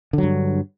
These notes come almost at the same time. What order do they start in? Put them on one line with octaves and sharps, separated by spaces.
D3 F#3 G2